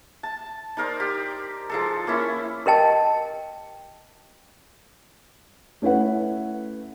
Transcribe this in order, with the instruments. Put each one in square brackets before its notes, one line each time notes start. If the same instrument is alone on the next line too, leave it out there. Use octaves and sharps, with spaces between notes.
[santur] A5
D#4 A#4 C5 D5
G4
F3 G#3 A4
A#3 C#4 E4
[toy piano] G4 A#4 D#5 G5 A5
[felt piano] A3 C#4 E4 B4 F#5